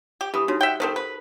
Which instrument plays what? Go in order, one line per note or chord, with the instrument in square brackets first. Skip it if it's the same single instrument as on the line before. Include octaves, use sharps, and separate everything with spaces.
[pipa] G4
[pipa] E3 [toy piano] G4 B5 D#6
[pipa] C#3 [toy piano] D#4 F#4
[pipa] E5 F#5 G5
[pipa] D#3 A3 C4 [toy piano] A4 A#4 C5
[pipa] B4